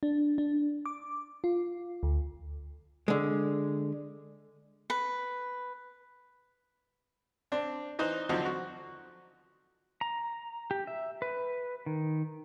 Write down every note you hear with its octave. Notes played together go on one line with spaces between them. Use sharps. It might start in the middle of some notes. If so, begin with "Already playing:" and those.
D4
D4
D6
F4
D2
D3 G#3
B4
C4 D4
E3 D#4 C5 D#6 F#6
D3 F3 F#3 C4 D#4
F#4
A#5
G4
E5
B4
D#3